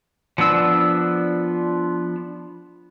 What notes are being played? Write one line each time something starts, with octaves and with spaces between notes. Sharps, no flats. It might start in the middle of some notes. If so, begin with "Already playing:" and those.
F3 B3 D4 E6